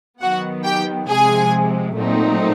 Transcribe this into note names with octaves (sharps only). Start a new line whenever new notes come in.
D#3 F#3 B3 F#4 F#5
G4 G5
C3 F3 G#3 G#4 G#5
A#2 F#3 A3 C4 D#4